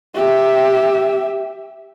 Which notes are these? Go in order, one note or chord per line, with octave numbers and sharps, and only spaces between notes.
G4 E5